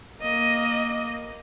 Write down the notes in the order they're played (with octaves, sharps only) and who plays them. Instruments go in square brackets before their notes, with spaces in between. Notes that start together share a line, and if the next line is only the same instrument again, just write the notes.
[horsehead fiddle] A#3 D#5